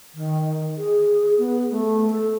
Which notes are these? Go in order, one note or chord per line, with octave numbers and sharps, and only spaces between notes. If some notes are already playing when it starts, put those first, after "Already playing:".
D#3
G#4
B3
A3
A4